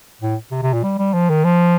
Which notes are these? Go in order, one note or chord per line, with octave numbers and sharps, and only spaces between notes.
A2
C3
C3
A#2
G3
G3
F3
D#3
F3